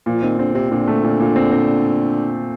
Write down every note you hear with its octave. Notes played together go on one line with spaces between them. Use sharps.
A#2 F3
D#3 C4
D3 C4
C3 C4
A#2 D3
A3
A#2
A#2
C4
C4